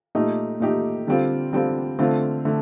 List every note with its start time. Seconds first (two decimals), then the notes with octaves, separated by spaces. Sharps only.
0.15 A#2 A3 D#4 G4
0.60 A#2 A3 D#4 G4
1.07 D3 G3 C4 F4
1.53 D3 G3 C4 F4
1.99 D3 A3 C4 F4
2.45 D3 A3